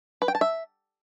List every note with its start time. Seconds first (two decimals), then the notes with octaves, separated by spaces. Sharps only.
0.22 B4
0.28 G5
0.35 A5
0.41 E5